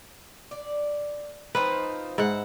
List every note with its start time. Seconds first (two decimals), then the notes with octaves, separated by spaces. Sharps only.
0.51 D5
1.55 F3 C4 D#4 B4
2.18 G#2 E4 F#5